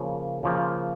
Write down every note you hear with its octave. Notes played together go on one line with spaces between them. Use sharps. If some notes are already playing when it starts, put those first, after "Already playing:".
Already playing: C#3 F3 A#3 A#4
C#3 F3 A#3